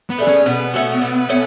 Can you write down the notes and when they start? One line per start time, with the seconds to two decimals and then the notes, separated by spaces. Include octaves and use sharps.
0.10 B3
0.18 A3 D4 G#4
0.28 C#4
0.46 B2 B3
0.74 A3 C#4 F#4
1.02 B2
1.29 A3 C#4